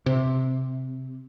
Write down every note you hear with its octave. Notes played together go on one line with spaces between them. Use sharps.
C3